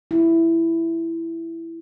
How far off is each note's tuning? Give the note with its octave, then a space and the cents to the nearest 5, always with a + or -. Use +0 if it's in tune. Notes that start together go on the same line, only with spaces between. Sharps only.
E4 +5